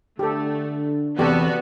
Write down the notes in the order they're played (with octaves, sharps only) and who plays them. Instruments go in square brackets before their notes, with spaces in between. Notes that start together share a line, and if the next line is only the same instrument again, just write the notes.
[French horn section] D3 D4 [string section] A3 [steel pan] G4 A4
[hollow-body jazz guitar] E2 C3 [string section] B3 F#4 [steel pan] G4 A4 [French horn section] D5